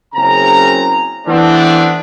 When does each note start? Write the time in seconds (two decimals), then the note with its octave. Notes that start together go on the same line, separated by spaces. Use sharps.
0.15 F#1 C#3 C4 A#5
1.27 E3 A3 B3 C4 D4